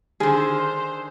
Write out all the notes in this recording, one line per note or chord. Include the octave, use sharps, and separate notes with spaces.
D3 D#3 G#4 C5